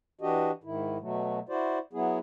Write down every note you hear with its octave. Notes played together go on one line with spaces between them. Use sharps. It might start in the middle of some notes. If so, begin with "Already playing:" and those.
E3 D4 F#4 G4 D#5
G#2 D#3 E4
B2 F#3 A3
E4 F#4 C5 D5
F#3 B3 E4 G#4